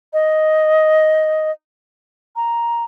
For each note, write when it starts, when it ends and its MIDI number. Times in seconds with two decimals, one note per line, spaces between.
0.13 1.51 75
2.36 2.84 82